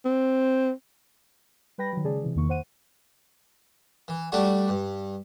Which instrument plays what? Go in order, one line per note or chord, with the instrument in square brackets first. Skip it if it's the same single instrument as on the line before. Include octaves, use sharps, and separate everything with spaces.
[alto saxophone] C4
[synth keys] G3 B4 G5 B5 A#6
D#3 F#3
C#3 G#3 G#4 D5 A5
C3 E3
E2 D#3 A#3 C#6
C5 F#5 D#7
[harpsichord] E3
G3 A3 D4 F#4
G2